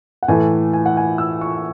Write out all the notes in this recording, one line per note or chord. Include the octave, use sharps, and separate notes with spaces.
F#5
A2 E3 A3 G#5
G#5
F#5
G#5
E6
C#6